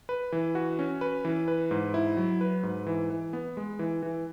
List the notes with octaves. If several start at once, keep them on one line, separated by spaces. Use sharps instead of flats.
B4
E3
F#4
C#4
B4
E3
B4
G#2
E4
F#3
B4
G#2
E3
E3
B3
G#3
E3
E3